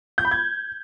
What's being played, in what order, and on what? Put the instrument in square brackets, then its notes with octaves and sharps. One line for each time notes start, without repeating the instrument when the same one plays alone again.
[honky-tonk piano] G6
B5
G#6